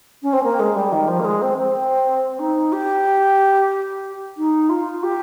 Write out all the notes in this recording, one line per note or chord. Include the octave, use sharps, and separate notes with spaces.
C#4
C4
A#3
G#3
G3
D#3
F3
A#3
G#3
C4
C4
D#4
G4
D#4
F4
G4